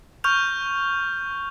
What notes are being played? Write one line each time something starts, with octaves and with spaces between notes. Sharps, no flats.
C#6 F6 G6 F7